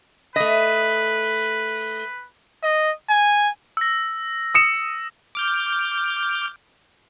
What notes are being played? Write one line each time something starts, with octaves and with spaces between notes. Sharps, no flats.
A3 B4 D#5
D#5
G#5
E6 A#6
D#6 C#7 E7
D6 F6 G6